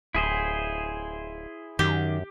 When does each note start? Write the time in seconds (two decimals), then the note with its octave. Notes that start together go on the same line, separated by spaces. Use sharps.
0.15 D1 E4 G#4 C5
1.79 F#2 D#3 G4